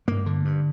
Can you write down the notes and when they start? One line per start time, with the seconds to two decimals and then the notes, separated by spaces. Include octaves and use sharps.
0.08 G2 A#3
0.26 D3
0.45 G2